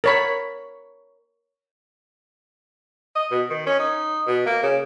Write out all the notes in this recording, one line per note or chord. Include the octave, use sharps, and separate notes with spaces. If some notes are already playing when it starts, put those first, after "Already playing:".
A#4 C#5 B5
D#5
B2
D#3
C#4
D#4
B2
A#3
C#3